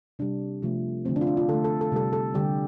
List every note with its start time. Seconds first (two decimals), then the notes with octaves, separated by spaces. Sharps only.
0.19 C3 G3 D4
0.62 C3 F3 A3
1.05 D3 F3 A3 C4
1.16 D4
1.21 F4
1.27 D4
1.37 F4
1.48 D3 A4
1.53 A3
1.64 A4
1.81 A4
1.92 C3 G3 A4
2.13 A4
2.34 D3 G3 G4